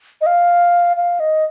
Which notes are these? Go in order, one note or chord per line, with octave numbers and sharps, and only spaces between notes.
D#5
F5
F5
D#5